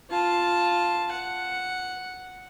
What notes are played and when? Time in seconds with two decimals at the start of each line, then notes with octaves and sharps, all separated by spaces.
0.11 F4 A5
1.13 F#5